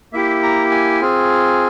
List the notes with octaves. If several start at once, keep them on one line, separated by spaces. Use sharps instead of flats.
A#3 E4 G4 E5
A#5
G#5
C4 F4 G#4